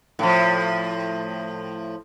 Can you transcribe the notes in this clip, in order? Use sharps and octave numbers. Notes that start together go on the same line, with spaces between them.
A2 F3